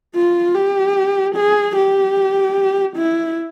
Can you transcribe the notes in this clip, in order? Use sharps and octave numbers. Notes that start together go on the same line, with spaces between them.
F4
G4
G#4
G4
E4